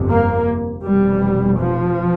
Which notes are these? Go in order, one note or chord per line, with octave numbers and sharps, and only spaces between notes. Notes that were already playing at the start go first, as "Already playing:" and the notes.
Already playing: G1 F2 C3
A#3
F1 E2 B2 G3
F3